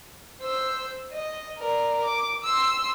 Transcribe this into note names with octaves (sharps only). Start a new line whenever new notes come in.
C5 E6
D#5
A#4 D5
D6
C6 E6